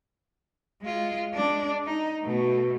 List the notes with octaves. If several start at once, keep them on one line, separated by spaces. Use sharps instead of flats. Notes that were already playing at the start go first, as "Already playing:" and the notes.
G#3 F4
G#3 D4
D#4
B2 A3